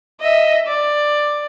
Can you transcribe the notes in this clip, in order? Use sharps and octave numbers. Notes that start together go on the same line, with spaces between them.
D#5 E5
D5